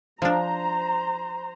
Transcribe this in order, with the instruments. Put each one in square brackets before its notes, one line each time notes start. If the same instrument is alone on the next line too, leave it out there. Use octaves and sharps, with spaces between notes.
[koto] F3 D4 [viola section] C5 A#5